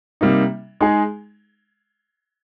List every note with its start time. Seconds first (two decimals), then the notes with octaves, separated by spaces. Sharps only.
0.21 C3 G3 A#3 D#4
0.81 G#3 D#4 G#4